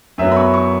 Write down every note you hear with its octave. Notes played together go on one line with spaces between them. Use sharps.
F#2 F#3 B3 E5
B5
C#6
C#6